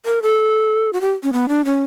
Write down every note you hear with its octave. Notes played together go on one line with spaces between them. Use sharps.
A#4
A4
F#4
G4
C#4
B3
D4
C#4